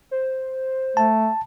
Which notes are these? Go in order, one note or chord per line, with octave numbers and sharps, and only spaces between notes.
C5
A3 A5